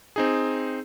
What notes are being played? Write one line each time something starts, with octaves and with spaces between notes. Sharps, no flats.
C4 D#4 G#4